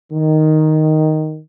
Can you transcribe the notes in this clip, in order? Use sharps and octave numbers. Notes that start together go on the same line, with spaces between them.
D#3